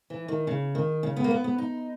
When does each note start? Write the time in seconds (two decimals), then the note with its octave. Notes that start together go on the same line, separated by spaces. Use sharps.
0.10 E3
0.28 D#3
0.47 C#3
0.75 D#3
1.03 C#3
1.16 B3
1.24 A#3
1.31 B3
1.44 B3
1.58 D#4